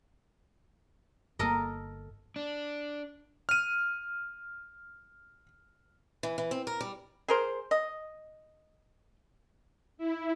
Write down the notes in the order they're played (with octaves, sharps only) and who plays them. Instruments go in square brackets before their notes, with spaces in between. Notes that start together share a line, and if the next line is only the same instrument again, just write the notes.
[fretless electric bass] G1 A#3 [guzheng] A4 A#4 D#5
[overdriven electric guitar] D4
[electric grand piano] F6 D#7
[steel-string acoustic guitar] E3
E3
C4
A#4
G3
[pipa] G#4 A#4 C5
D#5
[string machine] E4